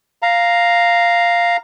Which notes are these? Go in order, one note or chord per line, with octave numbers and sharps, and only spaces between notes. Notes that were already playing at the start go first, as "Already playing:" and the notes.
F5 A#5